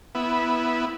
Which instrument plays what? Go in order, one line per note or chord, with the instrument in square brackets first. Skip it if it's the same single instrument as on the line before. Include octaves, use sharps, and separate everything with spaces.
[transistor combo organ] B3 E4